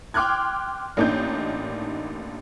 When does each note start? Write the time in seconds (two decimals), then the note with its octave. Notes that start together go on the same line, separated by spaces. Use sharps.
0.14 G5 C6 D6 F6 F#6 G#6
0.97 A1 A#3 D4 D#4 G6